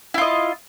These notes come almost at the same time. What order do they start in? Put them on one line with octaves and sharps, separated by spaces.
E4 F4 D#5